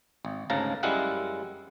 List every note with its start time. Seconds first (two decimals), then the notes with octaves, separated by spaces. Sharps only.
0.25 G#1
0.50 D2 G#2 C#3 F5 A5 A#5
0.83 F#2 G3 G#3 E4 F5 F#5